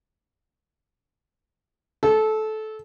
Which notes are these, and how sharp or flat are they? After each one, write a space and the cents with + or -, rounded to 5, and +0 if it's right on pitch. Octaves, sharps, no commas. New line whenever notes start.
A4 -20